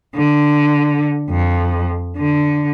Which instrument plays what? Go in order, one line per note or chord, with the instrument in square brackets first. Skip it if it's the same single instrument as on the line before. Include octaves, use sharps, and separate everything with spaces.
[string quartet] D3
F2
D3